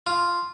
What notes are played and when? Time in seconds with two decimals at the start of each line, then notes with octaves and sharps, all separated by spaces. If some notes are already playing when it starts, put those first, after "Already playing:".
0.07 F4